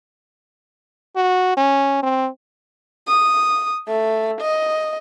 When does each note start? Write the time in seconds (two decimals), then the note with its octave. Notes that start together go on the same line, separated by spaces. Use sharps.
1.16 F#4
1.57 C#4
2.03 C4
3.07 D#6
3.88 A3
4.41 D#5